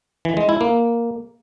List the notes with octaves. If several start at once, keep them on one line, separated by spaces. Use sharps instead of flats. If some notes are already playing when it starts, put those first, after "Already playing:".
E3
G#3
E4
A#3